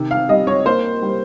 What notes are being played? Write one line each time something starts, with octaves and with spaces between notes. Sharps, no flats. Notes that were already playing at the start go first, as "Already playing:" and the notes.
Already playing: C3 D#3
F5
G3 D#5
C#5
A#3 C5
G3